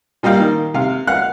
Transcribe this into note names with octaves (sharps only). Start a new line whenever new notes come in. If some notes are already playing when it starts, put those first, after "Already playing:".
A#2 G3 D#5 F5 G5
D#3
C3 F5
F5 F#5 F#6